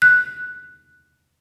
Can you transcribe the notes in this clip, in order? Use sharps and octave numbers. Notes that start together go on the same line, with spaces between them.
F#6